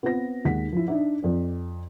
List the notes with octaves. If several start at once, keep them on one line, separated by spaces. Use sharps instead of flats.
B3 C4 F4 B4 A#6
D#2 G#3 F#5 B6
F3 E4
D4 D#4 E5
F2 D5